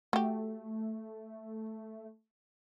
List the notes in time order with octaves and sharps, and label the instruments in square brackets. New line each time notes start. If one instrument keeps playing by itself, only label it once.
[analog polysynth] A3 [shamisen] F#4 G4